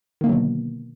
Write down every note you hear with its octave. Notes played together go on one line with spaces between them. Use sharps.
B2 D3 D#3 F#3 A#3